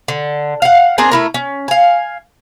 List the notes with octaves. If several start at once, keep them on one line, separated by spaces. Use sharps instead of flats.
D3
F5 F#5
C4 D4 G#4 A#4
A3 E4 A#4
C#4
F5 G#5